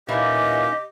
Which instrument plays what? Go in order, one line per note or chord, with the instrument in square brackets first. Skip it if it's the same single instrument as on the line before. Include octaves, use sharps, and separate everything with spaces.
[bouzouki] A#2 E3 [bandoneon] A#3 C#4 D#4 [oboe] G4 [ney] D#5